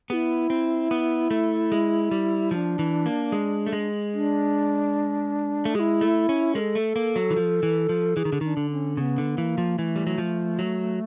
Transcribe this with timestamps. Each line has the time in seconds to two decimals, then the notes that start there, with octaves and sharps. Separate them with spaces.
0.10 B3 E4 G#4
0.50 C4
0.91 B3
1.31 A3
1.72 G#3
2.11 G3
2.51 F3 D4 E4
2.79 E3
3.06 A#3
3.32 G#3
3.67 A3
3.73 G#3
4.13 D4
5.65 A3
5.75 G#3 G#4
5.79 E4
6.01 A3
6.29 C#4
6.55 G#3 A#4
6.59 A4
6.75 A3
6.96 A#3
7.16 F#3
7.31 E3
7.37 F3
7.63 E3
7.89 F3
8.17 E3 G#4
8.25 D#3
8.33 D3
8.41 D#3 D4
8.57 D3
8.71 C#4
8.97 C#3 B3
9.18 D3
9.38 E3 A#3
9.58 F3
9.77 E3 A3
9.96 G3
10.07 F#3
10.18 F3
10.59 F#3